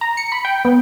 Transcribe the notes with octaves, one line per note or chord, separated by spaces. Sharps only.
A#5
C#7
B5
G5
B3